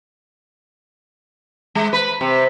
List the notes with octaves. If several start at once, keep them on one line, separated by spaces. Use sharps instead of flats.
G#3
B4
C3